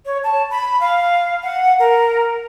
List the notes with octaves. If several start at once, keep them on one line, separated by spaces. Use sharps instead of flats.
C#5
A5
B5
F5
F#5
A#4